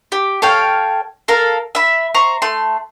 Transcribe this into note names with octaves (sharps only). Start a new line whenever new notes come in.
G4
A4 C#5 F5 G5
A4 A#4 F5 A#5
E5 B5
C5 A#5 C#6
A3 C6